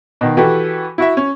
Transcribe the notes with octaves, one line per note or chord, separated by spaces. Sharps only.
B2 D#3
E3 F#4 G4 A4 B4
E4 F#4 E5
C#4